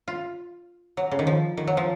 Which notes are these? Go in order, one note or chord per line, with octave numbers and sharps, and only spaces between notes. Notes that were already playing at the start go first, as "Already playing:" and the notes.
F4
F#3
C#3
D#3
F3
D#3
F#3
F3